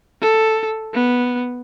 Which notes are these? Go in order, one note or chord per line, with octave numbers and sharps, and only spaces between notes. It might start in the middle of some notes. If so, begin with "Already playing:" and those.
A4
B3